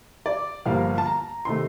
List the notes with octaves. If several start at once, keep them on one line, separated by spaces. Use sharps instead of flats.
D5
G1 G2 F3 A#3 F5
A5
A#5
C3 D#3 A3 C6